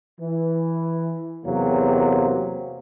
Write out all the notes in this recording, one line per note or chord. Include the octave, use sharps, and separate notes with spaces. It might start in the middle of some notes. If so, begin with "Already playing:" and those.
E3
E2 C3 F#3 A#3